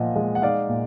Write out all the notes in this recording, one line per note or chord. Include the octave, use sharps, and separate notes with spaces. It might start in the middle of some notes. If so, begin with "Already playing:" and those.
Already playing: A#2 F3 D#5 F#5
G#3
F#5
D#4 D5 F5
A#2